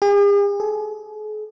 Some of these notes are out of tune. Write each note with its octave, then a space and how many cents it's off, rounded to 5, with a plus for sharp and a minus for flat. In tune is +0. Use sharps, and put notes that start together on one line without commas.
G#4 -45
G#4 +45